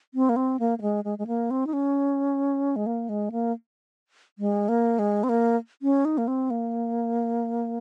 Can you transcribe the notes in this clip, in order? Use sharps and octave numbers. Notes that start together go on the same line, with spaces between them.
C4
A#3
C4
A#3
A#3
G#3
G#3
G#3
A#3
C4
D#4
C#4
G#3
A#3
G#3
A#3
G#3
A#3
G#3
C4
A#3
C#4
D#4
A#3
C4
A#3